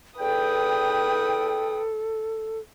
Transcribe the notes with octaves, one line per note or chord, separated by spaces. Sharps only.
E2 A4 B4 G5 D#6